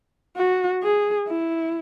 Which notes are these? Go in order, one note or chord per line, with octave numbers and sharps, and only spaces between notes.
F#4
G#4
E4